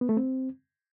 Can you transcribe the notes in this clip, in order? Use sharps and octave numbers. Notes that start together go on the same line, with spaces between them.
B3
A3
C4